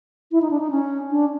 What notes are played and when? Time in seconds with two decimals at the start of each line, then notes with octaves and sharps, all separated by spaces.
0.31 E4
0.42 D#4
0.51 D4
0.60 D#4
0.71 C#4
1.11 D4